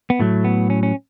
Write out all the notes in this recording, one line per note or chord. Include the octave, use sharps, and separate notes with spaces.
B3
A2 F#3 A3
B3
C#4
C#4